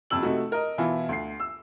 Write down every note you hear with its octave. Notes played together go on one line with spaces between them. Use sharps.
F#1 F2 C3 E6 F#7
C3 A3 D#4 F#4
A#4 D#5
B2 E3 E4 F4
D2 C7
E6